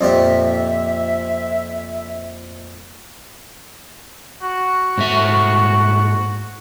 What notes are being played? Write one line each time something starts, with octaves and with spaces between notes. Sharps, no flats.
F2 A#2 G4 E5
F#4
G#2 A3 E5